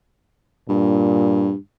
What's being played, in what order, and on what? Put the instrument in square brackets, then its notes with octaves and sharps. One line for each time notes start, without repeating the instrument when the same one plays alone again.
[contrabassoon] G2 [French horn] A#2